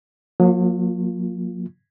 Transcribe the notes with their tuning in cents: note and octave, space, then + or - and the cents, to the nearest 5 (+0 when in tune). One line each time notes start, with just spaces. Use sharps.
F#3 -40 A#3 +0 F4 +0